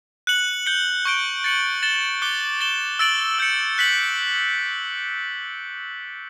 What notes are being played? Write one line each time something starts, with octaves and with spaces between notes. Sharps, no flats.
F#6 C#7 F#7
G6 C#7 G7
C#6 G6 D7 G7
A6 C#7 F#7
A6 E7 G7
D6 F#6 C#7 G7
A6 E7 G7
E6 A6 D7 F#7
E6 G6 C#7
F#6 B6 F#7